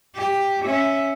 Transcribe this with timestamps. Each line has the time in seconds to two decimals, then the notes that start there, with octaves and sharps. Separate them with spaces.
0.16 G4
0.65 C#4 E5